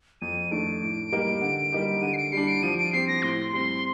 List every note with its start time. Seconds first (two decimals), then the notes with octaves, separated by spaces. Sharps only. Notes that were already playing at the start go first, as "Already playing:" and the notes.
0.21 F2 D#7
0.51 D#3 A3 D4 D7
0.82 A2
1.12 G3 A#3 D#4 G4
1.41 D3
1.72 G3 A#3 D#4 G4
2.02 D3 D#7
2.13 C7
2.17 D7
2.32 G3 D4 C7
2.48 D7
2.63 F3 D#7
2.77 D7
2.93 C4 G4 C7
3.08 A#6
3.23 A2 C6
3.53 G3 C4 C6